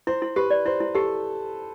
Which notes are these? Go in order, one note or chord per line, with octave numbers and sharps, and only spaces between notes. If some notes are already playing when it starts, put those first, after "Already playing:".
E4 C5
E4
G4 B4
D5
E4 C5
E4
G4 A4